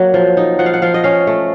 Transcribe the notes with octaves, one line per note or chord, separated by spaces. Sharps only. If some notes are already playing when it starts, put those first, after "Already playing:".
Already playing: F#3 A#3
F3
D#4
F3 F#5
F5
F#5
F3 F5
D#5
C#4 F5
A3